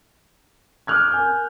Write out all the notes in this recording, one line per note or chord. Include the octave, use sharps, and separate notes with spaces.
D6 D#6 F6 F#6 G#6
A#4 G#5 G6